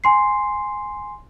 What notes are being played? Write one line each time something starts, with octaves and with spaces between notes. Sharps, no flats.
G#5 C6 C7